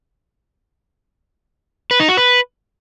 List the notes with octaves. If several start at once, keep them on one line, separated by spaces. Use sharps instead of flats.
B4
D#4
F#4
B4